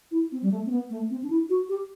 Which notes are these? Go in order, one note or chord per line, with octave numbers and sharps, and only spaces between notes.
E4
C4
G3
A3
C4
B3
A3
C4
D4
E4
F#4
G4